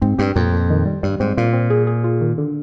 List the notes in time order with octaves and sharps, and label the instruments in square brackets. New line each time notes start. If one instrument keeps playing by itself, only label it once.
[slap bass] G#2 [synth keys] C4
[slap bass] G2 [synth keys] G4
[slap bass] F2 [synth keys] A#2
[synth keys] A#2
D#3
G3
[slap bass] G2 [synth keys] G3
[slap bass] G#2 [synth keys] C4
[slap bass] A#2 [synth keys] F4
[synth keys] C4
G#4
G#4
F4
D#3
D3